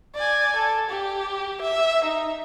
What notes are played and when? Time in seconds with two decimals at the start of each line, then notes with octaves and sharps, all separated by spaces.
0.15 D5 G#5
0.56 A4
0.90 G4
1.62 E5
2.05 D#4